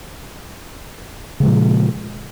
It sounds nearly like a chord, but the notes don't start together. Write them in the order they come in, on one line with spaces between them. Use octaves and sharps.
C#3 G#3 F3 A#2